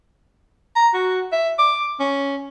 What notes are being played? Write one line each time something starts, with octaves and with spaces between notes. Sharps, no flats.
A#5
F#4
E5
D6
C#4